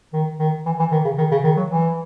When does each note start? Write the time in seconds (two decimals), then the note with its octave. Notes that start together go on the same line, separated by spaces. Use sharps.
0.13 D#3
0.39 D#3
0.66 E3
0.79 E3
0.92 D#3
1.04 C#3
1.18 D#3
1.31 C#3
1.44 D#3
1.57 F#3
1.70 E3